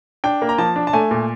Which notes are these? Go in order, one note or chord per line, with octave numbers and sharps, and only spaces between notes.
D4 G5
A#3
A#5
F3 A5
D4
A5
A3 G#5
A#2